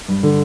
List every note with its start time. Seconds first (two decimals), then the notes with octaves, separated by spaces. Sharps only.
0.08 G2
0.23 D3